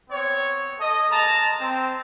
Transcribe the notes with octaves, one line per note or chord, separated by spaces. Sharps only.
B3 C4 C#5
A4 D#5
G#3 A#3 A5 A#5
C4